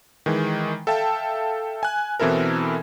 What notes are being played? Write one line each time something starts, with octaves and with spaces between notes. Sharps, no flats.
D#3 E3 G#3
A4 E5 F5 G5 A5
G#5 F#6
B2 E3 C4 E4 A4 A#4